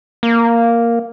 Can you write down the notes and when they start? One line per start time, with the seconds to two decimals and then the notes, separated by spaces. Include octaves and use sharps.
0.23 A#3